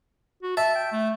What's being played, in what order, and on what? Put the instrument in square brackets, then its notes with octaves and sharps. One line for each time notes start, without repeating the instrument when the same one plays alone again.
[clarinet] F#4
[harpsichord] E5 [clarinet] A5
[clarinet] G5
A3